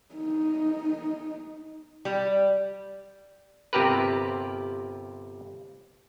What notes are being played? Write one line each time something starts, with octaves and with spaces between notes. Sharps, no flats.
D#4
G3
G1 C3 C4 G4 A#4 B4